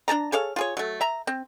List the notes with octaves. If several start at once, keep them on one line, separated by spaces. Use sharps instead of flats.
D4 G#4 A5 A#5
G#4 A4 C#5 F5
F4 G#4 C#5
F#3 A3
E5 A#5
C4